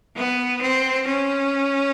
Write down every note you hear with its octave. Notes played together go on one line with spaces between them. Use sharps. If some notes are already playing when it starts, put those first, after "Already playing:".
B3
C4
C#4